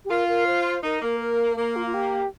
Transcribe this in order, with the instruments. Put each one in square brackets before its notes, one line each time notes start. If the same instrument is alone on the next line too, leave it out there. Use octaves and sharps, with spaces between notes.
[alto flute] G4
[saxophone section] F4 [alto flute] A#4
[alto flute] A#4
C5
[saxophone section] D#4 [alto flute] A#4
[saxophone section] A#3 [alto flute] A#4
[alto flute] A#4
[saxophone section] A#3 [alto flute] A#4
[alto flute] F4
F4
G4